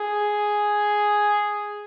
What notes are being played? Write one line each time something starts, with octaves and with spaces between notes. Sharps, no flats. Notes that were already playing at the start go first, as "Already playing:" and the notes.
Already playing: G#4